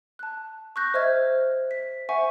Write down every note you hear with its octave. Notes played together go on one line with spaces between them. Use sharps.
A5 F#6
C#6 E6 F#6 G6 A#6
C5 D#5 E5 F6 G#6
B6
C5 E5 F#5 G#5 C#6